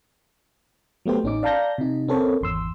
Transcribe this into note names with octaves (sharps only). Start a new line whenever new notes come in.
F#3 A3 B3 G4 C5
A1 C#4 D#4 D6
D5 F5 A5 A#5 G6 A#6
C3 D#4
C4 C#4 A4 A#4 C5 C#5
G#1 E2 C6 E6